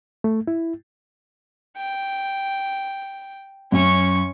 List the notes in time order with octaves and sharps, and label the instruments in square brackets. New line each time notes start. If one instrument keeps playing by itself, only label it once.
[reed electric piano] A3
E4
[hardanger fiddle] G5
[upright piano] F#2 [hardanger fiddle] C#4 C#6